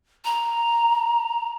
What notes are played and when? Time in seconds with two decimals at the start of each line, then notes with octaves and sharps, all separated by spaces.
0.25 A#5